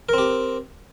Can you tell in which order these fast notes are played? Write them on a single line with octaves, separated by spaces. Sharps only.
A#4 C4 G4